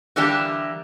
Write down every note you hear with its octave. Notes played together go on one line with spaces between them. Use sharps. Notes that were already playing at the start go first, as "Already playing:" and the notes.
D3 E3 G3 A#3 D4 G4